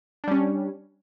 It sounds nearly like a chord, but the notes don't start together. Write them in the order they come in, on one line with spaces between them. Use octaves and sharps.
D4 G3 C#4